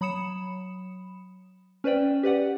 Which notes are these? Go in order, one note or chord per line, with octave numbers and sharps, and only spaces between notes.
F#3 B5 D#6 C#7 E7
C#4 B4 C5 D5 G5
G4 B4 D5 F#5